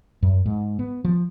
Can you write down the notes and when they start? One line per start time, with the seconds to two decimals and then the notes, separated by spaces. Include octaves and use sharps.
0.23 F#2
0.46 G#2
0.79 B3
1.04 F3